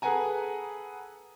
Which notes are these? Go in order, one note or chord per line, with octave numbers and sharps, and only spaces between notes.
G#4 A4 B4 F#5 G#5 A#5